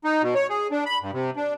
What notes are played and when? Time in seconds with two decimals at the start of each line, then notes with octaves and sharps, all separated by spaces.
0.04 D#4
0.22 B2
0.35 C#5
0.49 G#4
0.71 D4
0.86 B5
1.02 G2
1.13 C3
1.36 D4